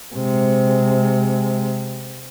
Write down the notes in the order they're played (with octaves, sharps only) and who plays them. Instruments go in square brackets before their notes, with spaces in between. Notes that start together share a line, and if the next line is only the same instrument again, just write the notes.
[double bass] C3 G#3